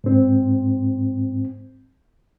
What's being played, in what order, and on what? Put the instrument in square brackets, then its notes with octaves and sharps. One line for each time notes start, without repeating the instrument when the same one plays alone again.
[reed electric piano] G#2 C4